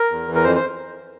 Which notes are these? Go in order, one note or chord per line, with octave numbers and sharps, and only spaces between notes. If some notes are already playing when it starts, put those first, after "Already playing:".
Already playing: A#4
E2
E3
A#4
F2 C5
C5